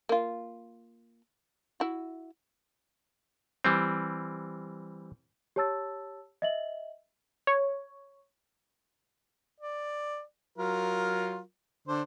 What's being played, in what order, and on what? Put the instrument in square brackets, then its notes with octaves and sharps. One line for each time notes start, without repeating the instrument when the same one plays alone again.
[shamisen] A#3 F4
E4 F#4
[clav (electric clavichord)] E3 G3 C4
[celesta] G4 C#5 A5 E6 A6
D#5 E5 F#7
[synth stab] C#5
[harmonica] D5
F#3 F4 A#4
D3 D4 C5